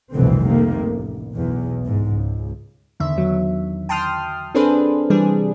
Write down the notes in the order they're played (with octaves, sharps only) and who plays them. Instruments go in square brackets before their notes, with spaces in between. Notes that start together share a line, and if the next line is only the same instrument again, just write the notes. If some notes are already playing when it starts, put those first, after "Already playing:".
[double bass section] F1 C2 B2 D3 E3 C4
C3 D#3 A3 A#3
A1
B1 E2
C2 G#2
C#2
[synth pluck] E2 D3 D#3 E5
E2 F#3
G5 A5 C6 D#6 F6
C4 D4 G#4 A4 B4 C5
C3 E3 G3 D4 G#4